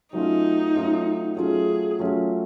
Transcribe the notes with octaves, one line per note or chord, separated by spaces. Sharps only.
F#3 A3 C#4 D#4 F4
F#3 A3 C#4 F4
F#3 A3 C#4 F4 G#4
F#3 A3 C#4 F4